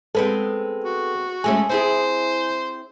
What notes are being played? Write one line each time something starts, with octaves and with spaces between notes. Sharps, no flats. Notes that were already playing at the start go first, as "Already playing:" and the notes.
G#3 B3 C4 A4 B4
F#4
G#3 A3 C#4 G#5
C4 E4 G#4 C5